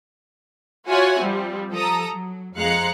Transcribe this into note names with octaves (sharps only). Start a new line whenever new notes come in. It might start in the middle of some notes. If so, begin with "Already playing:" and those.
F4 F#4 C#5 E5 F#5 G#5
F3 G3 C4
F3 A4 A#5 D#6
F#3
F2 G#3 F5 A#5 F#6 C#7